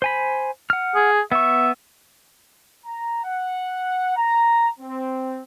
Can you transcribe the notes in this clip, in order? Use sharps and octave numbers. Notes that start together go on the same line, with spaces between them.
C5 G#5 B5
F#5 F6
G#4
B3 E5 C#6
A#5
F#5
A#5
C4